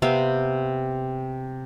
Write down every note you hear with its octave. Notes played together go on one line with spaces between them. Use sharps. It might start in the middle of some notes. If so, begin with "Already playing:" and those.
C3 B3 C4 F5